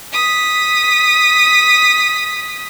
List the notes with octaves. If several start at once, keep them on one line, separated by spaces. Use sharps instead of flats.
D#6 B6